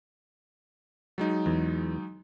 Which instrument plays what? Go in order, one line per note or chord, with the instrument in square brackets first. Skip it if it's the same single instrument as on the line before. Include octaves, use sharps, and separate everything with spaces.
[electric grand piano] F#3 G#3 D#4
[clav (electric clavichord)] E2